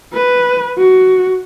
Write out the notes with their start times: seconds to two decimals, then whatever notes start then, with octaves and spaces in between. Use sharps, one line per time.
0.13 B4
0.78 F#4